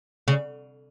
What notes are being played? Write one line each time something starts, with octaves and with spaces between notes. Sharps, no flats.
C#3